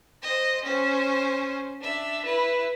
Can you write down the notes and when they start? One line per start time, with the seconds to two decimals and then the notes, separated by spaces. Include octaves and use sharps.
0.22 C5 D#5
0.64 C#4 C5
1.81 D4 E5
2.26 E4 B4